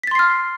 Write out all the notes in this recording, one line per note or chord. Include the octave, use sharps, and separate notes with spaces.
C6 F6 A6 B6 C7